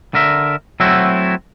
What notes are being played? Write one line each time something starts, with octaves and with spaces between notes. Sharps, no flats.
D3 A#4 E5
F#3 A3 C4 E4 F#4